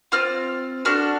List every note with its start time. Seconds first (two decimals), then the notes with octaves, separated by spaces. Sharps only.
0.12 C4 F4 F6
0.85 D4 F#4 A4 F6